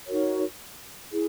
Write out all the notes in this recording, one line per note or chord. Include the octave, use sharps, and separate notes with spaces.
D#4 F#4 A#4 C#5
E4 G#4